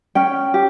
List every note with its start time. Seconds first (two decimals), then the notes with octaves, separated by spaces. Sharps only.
0.15 C#4 G5
0.54 G4